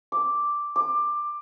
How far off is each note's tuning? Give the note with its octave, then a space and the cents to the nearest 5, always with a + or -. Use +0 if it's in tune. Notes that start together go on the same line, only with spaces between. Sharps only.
D6 +0
D6 +15